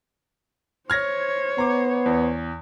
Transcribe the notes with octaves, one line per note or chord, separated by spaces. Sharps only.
C5 C#5 F6 G#6 A#6
B3 A#5 D6
E2